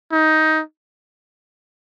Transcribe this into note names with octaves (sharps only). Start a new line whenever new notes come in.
D#4